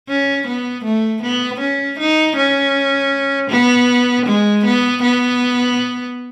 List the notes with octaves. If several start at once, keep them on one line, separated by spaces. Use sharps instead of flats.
C#4
B3
A3
B3
C#4
D#4
C#4
B3
G#3
B3
B3